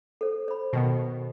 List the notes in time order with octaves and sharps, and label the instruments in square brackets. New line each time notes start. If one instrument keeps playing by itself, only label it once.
[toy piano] A4 C5
C5 B5
[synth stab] B2 D#3 B3